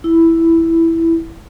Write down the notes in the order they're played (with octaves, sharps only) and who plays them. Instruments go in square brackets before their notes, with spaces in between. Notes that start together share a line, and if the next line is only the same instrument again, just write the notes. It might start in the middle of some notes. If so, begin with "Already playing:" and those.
[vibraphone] E4